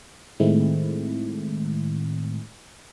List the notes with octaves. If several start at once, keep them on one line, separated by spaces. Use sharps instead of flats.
A2 D#3 G#3 A3 C4 E4